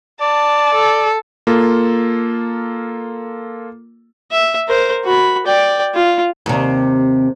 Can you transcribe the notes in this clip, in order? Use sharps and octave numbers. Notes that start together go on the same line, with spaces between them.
D5 A5
A4
A#3 F4 A4
E5
A#4 C5
F#4 B5
D5 G5
F4
D#2 C3